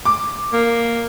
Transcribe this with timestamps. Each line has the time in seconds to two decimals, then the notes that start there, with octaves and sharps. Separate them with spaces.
0.05 D6
0.53 A#3